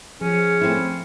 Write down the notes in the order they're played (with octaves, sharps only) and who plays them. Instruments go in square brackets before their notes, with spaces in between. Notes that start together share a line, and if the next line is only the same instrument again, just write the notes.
[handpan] F3 [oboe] C#4 [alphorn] G#4
[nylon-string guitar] A3 C4 E4